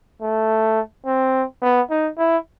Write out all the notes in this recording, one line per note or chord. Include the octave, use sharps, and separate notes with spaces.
A3
C4
B3
D#4
E4